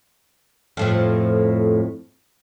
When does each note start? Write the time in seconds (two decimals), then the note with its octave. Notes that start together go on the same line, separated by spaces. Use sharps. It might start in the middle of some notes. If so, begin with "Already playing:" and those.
0.77 F2 A2 F3